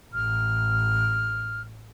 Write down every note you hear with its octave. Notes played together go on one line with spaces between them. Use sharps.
A1 F6